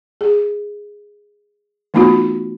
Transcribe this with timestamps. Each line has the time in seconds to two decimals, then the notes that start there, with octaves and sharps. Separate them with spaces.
0.21 G#4
1.94 E3 A3 B3 D#4 F4 F#4